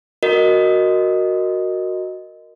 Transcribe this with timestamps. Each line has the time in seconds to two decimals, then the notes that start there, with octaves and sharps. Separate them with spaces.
0.23 F#4 A#4 D#5